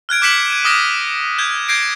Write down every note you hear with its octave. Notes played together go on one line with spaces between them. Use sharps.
F6 F#6 G#6 D7
D6 G6 B6 C#7 E7 F#7
G#6 D#7
D6 D#6 F6 A#6 C#7 D#7
F6 G6 G#6
G6 G#6 A#6 C7 D7